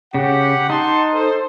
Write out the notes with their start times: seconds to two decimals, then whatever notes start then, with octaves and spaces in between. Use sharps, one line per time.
0.14 C#3 G4 F#5
0.70 D#4 F#5 A5 C6
1.13 A4 C5